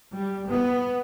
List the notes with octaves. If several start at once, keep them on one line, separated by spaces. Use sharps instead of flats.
G3
B3